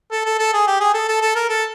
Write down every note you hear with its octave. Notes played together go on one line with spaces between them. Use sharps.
A4
A4
A4
G#4
G4
G#4
A4
A4
A4
A#4
A4